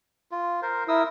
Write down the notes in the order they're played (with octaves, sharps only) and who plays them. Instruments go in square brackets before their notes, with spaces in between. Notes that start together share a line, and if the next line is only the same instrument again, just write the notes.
[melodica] F4
A#4 C5
[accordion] E4 [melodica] A#4 D#6 E6